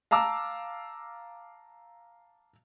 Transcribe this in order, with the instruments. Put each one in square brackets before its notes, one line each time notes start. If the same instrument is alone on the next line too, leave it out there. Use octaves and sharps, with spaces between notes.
[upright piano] F5 A5 A#5 D6 E6